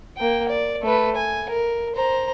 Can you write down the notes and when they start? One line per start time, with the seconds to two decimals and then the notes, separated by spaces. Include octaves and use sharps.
0.17 A#3 G5
0.48 D5
0.82 A3 B4
1.16 G#5
1.50 A#4
1.95 C5 A#5